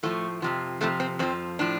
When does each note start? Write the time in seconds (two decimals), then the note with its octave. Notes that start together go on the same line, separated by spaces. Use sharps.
0.03 A2 F3 A3
0.42 F2 C3 F3
0.81 F2 C3 F3 A3
1.00 C4
1.19 F2 F3 C4
1.59 A2 F3 D4